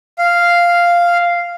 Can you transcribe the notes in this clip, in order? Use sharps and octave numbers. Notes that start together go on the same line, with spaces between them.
F5